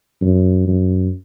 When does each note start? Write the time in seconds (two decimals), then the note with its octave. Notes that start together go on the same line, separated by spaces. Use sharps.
0.22 F#2
0.68 F#2